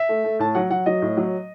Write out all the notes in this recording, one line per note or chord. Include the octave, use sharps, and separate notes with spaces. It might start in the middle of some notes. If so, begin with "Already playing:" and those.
Already playing: E5
A3
A3
A2 A5
F#3 F#5
F#3 F#5
F#3 D#5
A2
F#3